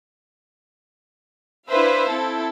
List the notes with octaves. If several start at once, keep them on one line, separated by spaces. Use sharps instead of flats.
D4 E4 B4 C5 E5 F5
C4 E4 A4